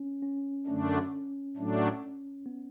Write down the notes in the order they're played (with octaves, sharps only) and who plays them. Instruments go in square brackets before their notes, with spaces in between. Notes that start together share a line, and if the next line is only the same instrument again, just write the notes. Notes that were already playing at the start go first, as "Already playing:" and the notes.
Already playing: [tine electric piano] C#4
C#4
[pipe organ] F#2 D3 A3 D4 [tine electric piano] C#4
[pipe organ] A2 F#3 A3 D4
[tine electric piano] B3